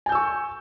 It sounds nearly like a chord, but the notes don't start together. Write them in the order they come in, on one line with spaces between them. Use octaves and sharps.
G#5 G6 E6 C#6